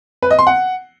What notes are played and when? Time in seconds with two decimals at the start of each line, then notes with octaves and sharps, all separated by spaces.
0.22 B4
0.31 D#5
0.39 C6
0.47 F#5